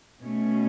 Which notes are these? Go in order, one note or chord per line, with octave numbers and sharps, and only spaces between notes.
B2 A3 C#4